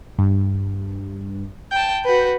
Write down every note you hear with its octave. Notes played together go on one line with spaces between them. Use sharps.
G2
G5 A5 G6
F#4 B4